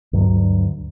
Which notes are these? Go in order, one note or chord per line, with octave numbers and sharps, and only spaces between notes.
D2 G2 F#3